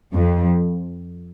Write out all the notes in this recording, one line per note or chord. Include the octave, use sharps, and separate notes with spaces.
F2